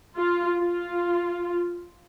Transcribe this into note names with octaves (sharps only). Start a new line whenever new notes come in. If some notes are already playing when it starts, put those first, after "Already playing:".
F4
F4